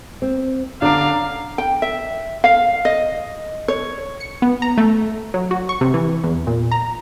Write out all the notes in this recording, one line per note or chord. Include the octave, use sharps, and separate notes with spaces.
C4
D3 C#4 D4 F5 A#5 D6
G5
E5
F5
D#5
C#5
C#7
B3
A#5
A3
F#3
F#4
C#6
C3
E3
E2
A#2
A#5